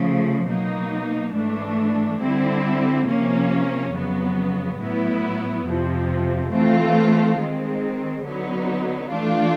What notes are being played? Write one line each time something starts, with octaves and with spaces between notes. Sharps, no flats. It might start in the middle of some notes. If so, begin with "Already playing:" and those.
Already playing: C#3 F3 A3
B2 F#3 A#3 D#4
G#2 E3 A3 D4
D3 G3 C4 E4
C3 F3 A#3 C#4
F2 C#3 F#3 B3
A2 F#3 B3 E4
F2 C3 F3
E3 A3 C4 F4
D#3 G#3 C4
D3 F#3 B3 D#4
E3 A3 D4 F4